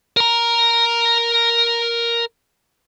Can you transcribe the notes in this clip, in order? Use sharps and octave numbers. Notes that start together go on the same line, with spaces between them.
A#4 A#5